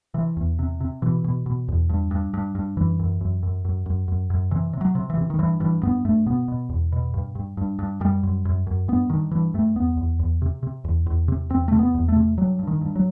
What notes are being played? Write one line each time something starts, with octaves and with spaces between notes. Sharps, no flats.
C3 E3
E2
C3
C3
B2 E3
B2
B2
E2
G2
G2
G2
G2
F#2 E3
F#2
F#2
F#2
F#2
F#2
F#2
F#2
C3 E3
C3
F#3
C3
E3
C3
D#3
G2 E3
G2 E3
G2 B3
G2 A3
B2 B3
B2
E2
B2
G2
G2
G2
G2
F#2 G3
F#2
F#2
F#2
G2 B3
G2 D#3
G2 E3
G2 A3
E2 B3
E2
E2
C3
C3
E2
E2
C3
E2 C4
C3 A3
B3
E2
A3
C3
G2 F#3
G2
D#3
G2
F#3